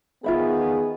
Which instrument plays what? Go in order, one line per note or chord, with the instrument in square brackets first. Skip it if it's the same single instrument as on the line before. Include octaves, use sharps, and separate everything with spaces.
[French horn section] D#3 B3 G#4 [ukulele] F4 E5 B5